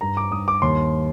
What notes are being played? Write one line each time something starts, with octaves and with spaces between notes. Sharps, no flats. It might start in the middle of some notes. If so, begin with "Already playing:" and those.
G2 A#5
D6
G2 D#6
D6
D#2 C6